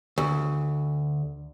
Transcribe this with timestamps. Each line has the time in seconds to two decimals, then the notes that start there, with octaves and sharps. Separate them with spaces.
0.18 D2